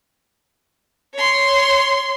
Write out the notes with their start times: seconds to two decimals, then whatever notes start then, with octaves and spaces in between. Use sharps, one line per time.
1.15 C#5 C6